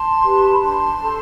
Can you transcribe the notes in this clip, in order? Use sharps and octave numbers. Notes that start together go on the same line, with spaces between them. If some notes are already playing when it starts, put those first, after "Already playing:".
Already playing: A5 C6
G4 B4
B5
D4 A5 C6
A4 C5